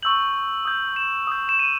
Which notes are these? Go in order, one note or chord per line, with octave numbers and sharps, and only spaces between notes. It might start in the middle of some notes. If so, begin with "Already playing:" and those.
C#6 E6 G6 F#7
D#6 G6
E7
D#6 G6
E7
D#7